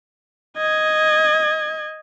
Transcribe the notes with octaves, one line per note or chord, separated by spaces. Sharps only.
D#5 G#6